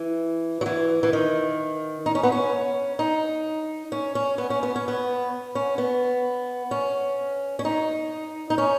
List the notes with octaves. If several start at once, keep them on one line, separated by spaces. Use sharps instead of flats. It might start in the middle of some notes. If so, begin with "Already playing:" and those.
Already playing: E3
F#3
E3
E3
D#3
D#4
C#4
B3
C#4
D#4
C#4
C#4
B3
C#4
B3
C#4
B3
C#4
B3
C#4
C#4
D#4
D#4
C#4